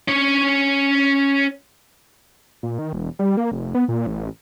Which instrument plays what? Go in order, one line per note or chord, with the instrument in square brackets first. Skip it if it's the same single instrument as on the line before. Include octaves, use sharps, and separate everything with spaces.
[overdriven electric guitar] C#4 C#5
[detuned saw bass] A#2
D#3
E1
G3
A#3
F1
B3
A#2
A1